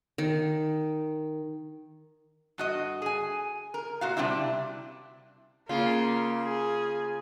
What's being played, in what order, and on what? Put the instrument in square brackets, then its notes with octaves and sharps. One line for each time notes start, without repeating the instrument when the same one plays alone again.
[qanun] D#3
[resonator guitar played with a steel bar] G2 F#4 D#5
G#4 G#5
A#4
A#2 F#4 F5
C3 G3 D4 E4
[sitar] C#3 F4 [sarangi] A#3
[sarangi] G#4